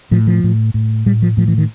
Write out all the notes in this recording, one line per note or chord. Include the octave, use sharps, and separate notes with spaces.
A2 F3
F3
A2
A2
A2 G3
F3
A2 F3
E3
D#3